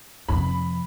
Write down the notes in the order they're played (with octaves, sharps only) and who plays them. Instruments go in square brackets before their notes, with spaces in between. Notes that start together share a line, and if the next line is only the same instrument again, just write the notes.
[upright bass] F2 C3 [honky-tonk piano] B5